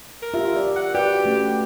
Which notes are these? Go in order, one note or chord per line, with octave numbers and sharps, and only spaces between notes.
A#4
F4 G4 E5
F4 G4 D5
F#5
F#4 G4 B4 D5
A3 C#4